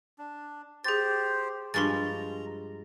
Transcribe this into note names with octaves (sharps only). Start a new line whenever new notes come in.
D4
G4 G#4 C5 A6
G2 F3 G#3 A#5 C6 C#6 A6